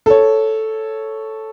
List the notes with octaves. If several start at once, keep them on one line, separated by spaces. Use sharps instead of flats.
A4 C#5